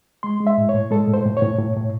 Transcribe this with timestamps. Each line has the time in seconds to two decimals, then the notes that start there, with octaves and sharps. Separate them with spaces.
0.23 G#3 C6
0.40 G#3
0.47 E5
0.58 A2
0.69 A2 C#5
0.91 G#3 A4
1.08 A2
1.14 C5
1.26 A2
1.37 C#5
1.42 A2
1.59 A2
1.76 A2